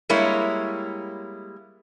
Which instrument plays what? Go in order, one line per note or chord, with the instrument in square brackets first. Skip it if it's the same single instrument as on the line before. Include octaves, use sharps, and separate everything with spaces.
[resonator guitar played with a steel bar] G3 G#3 A#3 E4 C#5